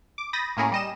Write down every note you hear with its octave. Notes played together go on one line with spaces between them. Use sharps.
D6
B5 D#6 G6 A6 A#6
A2 A#3 C#4 E4 G#4 A#4
G3 D#5 E7